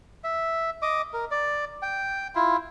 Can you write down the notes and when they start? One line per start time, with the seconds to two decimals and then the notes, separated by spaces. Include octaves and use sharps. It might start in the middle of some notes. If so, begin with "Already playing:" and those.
0.24 E5
0.82 D#5 D6
1.13 A#4
1.31 D5
1.82 G5
2.35 E4 F4